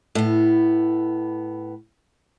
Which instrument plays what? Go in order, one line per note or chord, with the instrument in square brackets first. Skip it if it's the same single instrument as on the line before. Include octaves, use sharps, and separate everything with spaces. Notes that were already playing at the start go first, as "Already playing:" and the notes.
[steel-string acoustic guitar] A2 B3